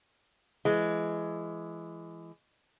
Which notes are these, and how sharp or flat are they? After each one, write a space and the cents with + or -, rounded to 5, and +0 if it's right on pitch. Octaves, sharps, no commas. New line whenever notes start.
E3 +25 G#3 +10